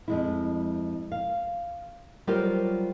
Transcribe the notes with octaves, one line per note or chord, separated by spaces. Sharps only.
F2 G#3 E4
F5
F#3 G3 F4 G4 A#4 C5